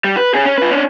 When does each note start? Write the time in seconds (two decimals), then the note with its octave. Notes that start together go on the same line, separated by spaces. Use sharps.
0.04 G3
0.17 B4
0.34 C#4 G#4
0.46 C#4
0.58 F4 B4
0.71 C#4 D4